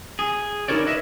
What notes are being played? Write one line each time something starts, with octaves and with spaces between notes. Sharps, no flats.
G#4
D#4 E4 F#4 A#4 C#5 D5
B4 D#5 E5